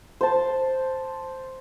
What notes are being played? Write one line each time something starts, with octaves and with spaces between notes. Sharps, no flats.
C5 A5